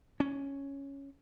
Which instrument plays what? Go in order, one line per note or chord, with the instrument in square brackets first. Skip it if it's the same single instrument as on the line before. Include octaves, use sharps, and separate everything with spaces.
[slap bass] C#4